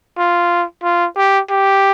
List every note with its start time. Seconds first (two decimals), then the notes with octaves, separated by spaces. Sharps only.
0.18 F4
0.83 F4
1.17 G4
1.51 G4